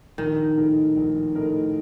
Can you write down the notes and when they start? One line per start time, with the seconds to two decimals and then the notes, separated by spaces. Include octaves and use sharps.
0.18 A#1 D#3
0.57 A2 A3 D#4 A#4
0.97 A#1
1.35 A2 A3 D#4 A#4